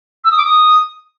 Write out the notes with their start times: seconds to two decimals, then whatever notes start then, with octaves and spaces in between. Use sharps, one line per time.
0.24 E6
0.31 D#6
0.38 D6
0.45 D#6